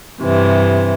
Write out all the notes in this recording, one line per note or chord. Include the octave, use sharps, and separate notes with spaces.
G2 C3 E3